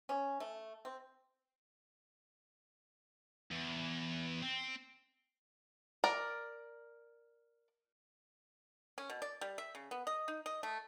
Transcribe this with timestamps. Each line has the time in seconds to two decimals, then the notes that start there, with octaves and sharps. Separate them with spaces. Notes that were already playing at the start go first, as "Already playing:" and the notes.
0.09 C#4
0.40 A3
0.85 C4
3.51 E2
4.42 C4
6.04 A#4 D5
8.98 C#4
9.10 B2
9.22 D5
9.41 G3
9.58 E5
9.75 C#3
9.91 B3
10.07 D#5
10.28 D#4
10.46 D#5
10.63 A3